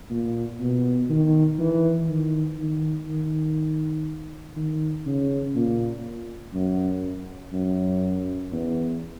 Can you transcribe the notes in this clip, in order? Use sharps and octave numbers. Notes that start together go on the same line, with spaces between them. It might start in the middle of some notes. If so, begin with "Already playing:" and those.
A#2
B2
D#3
E3
D#3
D#3
D#3
D#3
C#3
A#2
F#2
F#2
E2